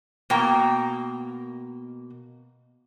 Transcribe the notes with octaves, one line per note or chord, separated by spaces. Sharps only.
B2 A#3 G5 A#5